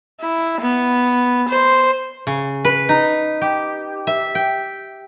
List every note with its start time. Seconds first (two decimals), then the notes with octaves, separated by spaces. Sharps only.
0.21 E4
0.61 B3
1.49 C5
2.27 C#3
2.65 B4
2.89 D#4
3.41 G4
4.07 E5
4.35 G5